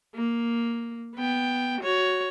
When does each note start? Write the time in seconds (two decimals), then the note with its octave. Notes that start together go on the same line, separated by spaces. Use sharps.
0.15 A#3
1.16 B3 G5
1.81 F#4 C#5